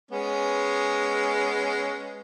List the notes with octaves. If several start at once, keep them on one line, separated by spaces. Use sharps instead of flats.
G#3 B3 C#4